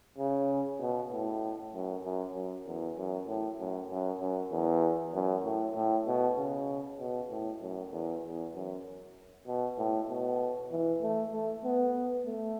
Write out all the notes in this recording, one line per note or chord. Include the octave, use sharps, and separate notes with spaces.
C#3
B2
A2
F#2
F#2
F#2
E2
F#2
A2
F#2
F#2
F#2
E2
F#2
A2
A2
B2
C#3
B2
A2
F#2
E2
E2
F#2
B2
A2
B2
E3
A3
A3
B3
A3